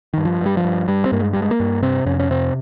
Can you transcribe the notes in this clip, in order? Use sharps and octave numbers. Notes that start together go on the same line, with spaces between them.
G2 D#3
F3
G2 G3
F3
G2
G2 G3
C4
G2 A#3
G#3
G2 G3
G#3
A#3
G2
C3 C4
F2 C#4
C#4
C3 C4